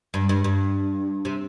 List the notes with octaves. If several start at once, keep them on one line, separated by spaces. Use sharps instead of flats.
G2
G2
G2
C3